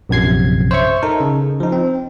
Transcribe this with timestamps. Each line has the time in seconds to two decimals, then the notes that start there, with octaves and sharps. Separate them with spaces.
0.09 A#1 F#2 C3 G#6 C7
0.71 C5 C#5 E5 C#6
1.03 D#4 A4 A#4
1.20 C#3
1.60 F3 D#4
1.72 C4